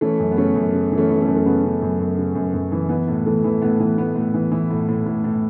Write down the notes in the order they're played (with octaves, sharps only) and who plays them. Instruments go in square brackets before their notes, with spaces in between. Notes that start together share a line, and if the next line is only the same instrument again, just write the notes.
[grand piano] E3 A3 C#4
F#2
B3
C#3 A3 C#4
F#2
C#3
E3
A3 C#4
E3
A3 C#4
F#2
A3
C#3 B3
C#3
F#2
F#2
C#3
F#2
F#2
E3
E3 B3
A2
E3 A3
E3
A2 B3
E3
A2 B3
A2
E3
E3
A2
A2
A2
A2